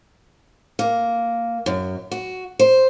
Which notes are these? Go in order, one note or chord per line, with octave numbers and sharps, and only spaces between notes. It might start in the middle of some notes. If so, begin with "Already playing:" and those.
A#3
F#2
F#4
C5